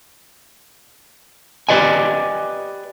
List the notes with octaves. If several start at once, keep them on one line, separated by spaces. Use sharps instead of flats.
G4 B4 D5 D#5 G#5